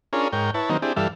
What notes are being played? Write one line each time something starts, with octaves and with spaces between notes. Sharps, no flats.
C#4 D4 F4 G#4 A#4 C#5
G#2 A#4 C#5 G5
E4 B4 C#5 A5
D#3 F#3 A#3 C4 D#4
C4 D4 E4 G4 G#4
G2 E3 G3 A4 E5 F5